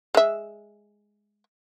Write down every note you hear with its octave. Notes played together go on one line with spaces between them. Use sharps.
G#3 E5